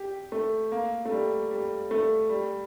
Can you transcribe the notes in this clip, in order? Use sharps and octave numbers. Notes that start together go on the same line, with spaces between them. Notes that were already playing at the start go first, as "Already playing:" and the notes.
Already playing: G4
A3
A#3
A3
G3
G3
A3
G3